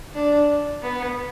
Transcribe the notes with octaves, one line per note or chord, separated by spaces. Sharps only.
D4
B3